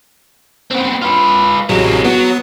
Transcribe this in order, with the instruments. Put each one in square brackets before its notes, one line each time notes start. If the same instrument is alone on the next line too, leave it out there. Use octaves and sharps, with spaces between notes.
[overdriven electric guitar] B3 C4
F4 B4
[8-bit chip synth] A1 F#3 [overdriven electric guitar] C3 G#3
[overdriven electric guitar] F#3 [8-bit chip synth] B3